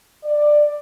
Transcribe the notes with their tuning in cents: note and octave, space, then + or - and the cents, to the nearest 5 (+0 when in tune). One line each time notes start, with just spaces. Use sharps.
D5 +15